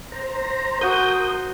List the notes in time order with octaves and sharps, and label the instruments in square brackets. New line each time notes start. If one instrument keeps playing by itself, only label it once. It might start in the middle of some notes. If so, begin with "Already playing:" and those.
[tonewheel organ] C5 A#5
[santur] F#4 C5 [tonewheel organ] A#4 D#6 G6